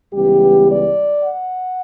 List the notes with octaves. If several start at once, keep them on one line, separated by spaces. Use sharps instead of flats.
C#2 C#3 E3 G3 B3 G4
D5
F#5